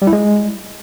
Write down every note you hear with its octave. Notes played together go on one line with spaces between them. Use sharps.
G3
E4
G#3